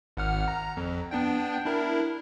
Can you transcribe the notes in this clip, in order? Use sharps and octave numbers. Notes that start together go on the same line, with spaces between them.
G#1 F#5 F6
A#5
F2
B3 D4 G5
D4 E4 A#4